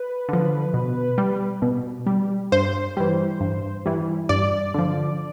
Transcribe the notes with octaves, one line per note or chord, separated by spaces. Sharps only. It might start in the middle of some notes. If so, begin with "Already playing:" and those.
Already playing: B4
D3 F3
B2
G3
B2
G3
G2 C5
E3 G3
G2
E3 G3
G2 D5
D3 F3